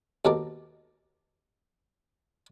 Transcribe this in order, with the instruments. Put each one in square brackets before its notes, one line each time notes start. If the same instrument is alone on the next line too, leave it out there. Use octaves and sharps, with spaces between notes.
[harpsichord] D#2 B2 A4 A#4 D6